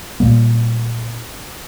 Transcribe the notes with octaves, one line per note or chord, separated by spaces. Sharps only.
A#2 G3 A#3